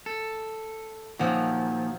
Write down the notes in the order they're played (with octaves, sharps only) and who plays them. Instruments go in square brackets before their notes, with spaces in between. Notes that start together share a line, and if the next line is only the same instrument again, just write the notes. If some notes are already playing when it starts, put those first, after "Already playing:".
[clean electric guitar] A4
[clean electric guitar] A#2 D#3 [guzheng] F3 F#3